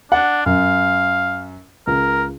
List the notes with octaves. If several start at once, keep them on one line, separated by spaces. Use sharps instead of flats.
D4 F#5
F#2 F5
C#2 A#4